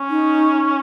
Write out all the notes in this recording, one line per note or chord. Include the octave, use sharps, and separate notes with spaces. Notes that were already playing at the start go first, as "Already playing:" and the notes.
Already playing: C#4
D#4